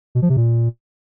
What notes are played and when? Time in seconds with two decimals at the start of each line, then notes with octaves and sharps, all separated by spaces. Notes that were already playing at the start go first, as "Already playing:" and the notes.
0.15 B2
0.22 F3
0.29 C3
0.37 A#2